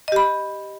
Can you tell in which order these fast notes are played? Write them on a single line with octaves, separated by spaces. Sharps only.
D#5 G4 B5